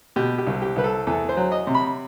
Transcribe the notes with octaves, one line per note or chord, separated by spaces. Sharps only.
B2 G4
G4
C2
G4
C2 B4
A4
E2 A4
C5
F#3
D#5
C3
B5